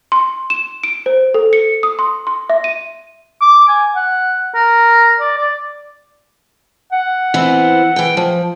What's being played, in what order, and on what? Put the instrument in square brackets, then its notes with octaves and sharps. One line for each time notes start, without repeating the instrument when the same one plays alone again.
[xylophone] C6
E7
D7
C5
A4
C#7
D#6
C6
C6
E5
D#7
[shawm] D6
G#5
F#5
A#4
D5
D5
[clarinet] F#5
[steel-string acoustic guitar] E3 B3 C4
E3 G5
F3